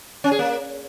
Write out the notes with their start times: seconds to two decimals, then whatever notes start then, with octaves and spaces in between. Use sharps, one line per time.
0.24 C#4
0.31 G#4
0.39 A#3